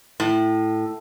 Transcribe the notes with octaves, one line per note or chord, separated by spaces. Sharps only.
A2